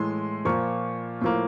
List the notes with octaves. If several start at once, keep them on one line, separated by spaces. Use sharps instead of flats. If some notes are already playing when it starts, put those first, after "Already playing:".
Already playing: A2 E3 G#3 C6
A#2 F3 A#3 C#6
A2 F3 A#3